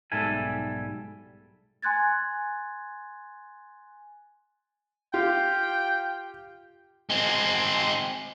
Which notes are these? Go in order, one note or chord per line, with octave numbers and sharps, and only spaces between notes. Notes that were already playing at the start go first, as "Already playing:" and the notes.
B1 G#2 G3 A4 E5 G#5
G#5 C6 F#6 G#6 A6
F4 G4 G5
G#3 C4